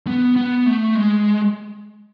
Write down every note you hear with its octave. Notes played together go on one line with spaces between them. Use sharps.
B3
B3
A3
G#3